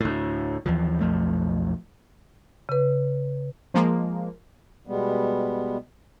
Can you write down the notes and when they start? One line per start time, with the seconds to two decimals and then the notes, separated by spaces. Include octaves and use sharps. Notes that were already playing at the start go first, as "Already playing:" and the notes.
0.01 D2 A2
0.66 D#2 E3 F3
1.01 B1 F2 F3 A3
2.69 C#3 B4
3.74 F3 G#3 A#3
4.87 B2 G3 G#3 B3